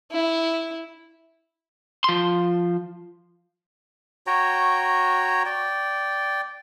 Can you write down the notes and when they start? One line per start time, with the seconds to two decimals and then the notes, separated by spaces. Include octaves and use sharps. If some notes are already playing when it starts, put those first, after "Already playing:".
0.12 E4
2.04 F3 C6
4.27 F#4 C#5 G5 A#5
5.46 D5 G5